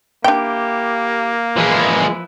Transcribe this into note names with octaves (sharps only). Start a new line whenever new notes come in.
A#3 D4 E4 G4 G5
E3 F3 G#3 E4 B4